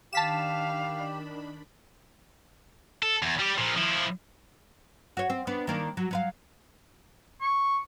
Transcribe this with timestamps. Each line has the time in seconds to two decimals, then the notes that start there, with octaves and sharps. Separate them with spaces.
0.13 D#3 D4 G4 F5 A5 B5 B6 E7
3.03 A4
3.22 E2
3.39 G3 G4
3.58 A#2 F3
3.76 F3 E4
5.17 F#4 C#5
5.30 C4
5.47 B3 D4
5.67 D#3 A#3 D4
5.97 F#3
6.11 F#3 B4 F5
7.41 C#6